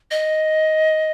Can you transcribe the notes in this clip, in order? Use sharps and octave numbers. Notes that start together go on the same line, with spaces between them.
D#5